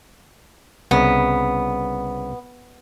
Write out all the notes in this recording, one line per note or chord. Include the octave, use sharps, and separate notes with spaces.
C2 C#3 B3